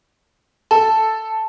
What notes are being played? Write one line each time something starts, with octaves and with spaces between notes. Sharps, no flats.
A4 A5